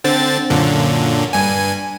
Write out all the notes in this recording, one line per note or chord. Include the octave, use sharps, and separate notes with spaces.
D3 C4 A6
F#2 A#2 D3
G2 G#5